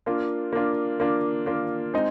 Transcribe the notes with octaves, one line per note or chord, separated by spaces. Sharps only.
A#3 D4 F4
A#3 D4 F4
A#3 D4 F4
A#3 D4 F4
G#3 C4 D#4